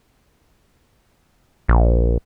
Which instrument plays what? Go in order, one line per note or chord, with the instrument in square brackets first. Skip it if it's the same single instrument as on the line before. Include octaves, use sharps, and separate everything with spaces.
[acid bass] A#1